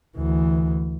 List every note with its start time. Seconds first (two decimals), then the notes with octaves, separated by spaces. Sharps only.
0.17 D2 E3